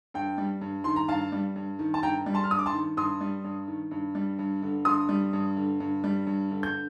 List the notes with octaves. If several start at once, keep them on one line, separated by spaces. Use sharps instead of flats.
G2 G5
G3
G2
D#3 C6
A#5
G2 F5 A5
G3
G2
D#3
A5
G2 G5 A#5
G3
A5 C6
F6
G2 D#6
D6
A5 C6
D#3
G2 C6 D#6
G3
G2
D#3
G2
G3
G2
D3
G2 C6 D#6
G3
G2
D3
G2
G3
G2
D3
G6